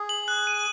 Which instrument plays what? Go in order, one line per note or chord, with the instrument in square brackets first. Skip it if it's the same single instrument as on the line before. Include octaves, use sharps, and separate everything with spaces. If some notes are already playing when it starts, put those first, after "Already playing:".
Already playing: [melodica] G#4
[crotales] F#7
F#6
D#7